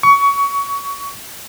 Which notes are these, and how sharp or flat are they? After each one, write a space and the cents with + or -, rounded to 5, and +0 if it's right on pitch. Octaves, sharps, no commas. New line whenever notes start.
C#6 +25